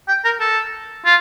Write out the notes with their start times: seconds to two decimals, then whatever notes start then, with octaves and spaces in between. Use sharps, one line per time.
0.08 G5
0.25 A#4
0.40 A4
1.05 F4